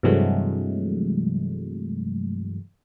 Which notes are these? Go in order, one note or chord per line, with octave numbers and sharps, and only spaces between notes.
G2 C3 E3 F#3 G#3 A3